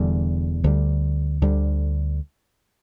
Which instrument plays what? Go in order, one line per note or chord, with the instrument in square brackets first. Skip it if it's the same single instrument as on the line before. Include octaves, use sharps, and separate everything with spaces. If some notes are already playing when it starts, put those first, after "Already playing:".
Already playing: [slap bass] E1 E2 D3 G3
D2 D3 G3
D2 D3 G3